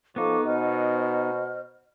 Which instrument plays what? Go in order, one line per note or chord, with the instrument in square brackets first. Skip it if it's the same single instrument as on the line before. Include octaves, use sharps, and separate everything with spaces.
[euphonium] F3 [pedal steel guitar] B3 D#4 [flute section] A4 C#6 D6
[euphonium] B2 [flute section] C5 D#5 F6